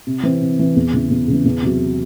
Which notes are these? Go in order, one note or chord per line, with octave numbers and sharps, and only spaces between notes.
C3
E3 C4
C3
E3 C4
E2
C#3 E3
E2
C#3 E3
E2
C3 F#3